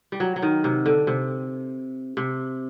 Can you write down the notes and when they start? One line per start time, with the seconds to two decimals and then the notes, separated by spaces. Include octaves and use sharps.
0.12 G3
0.20 F#3
0.36 F#3
0.42 D#3
0.64 C3
0.86 D3
1.07 C3
2.17 C3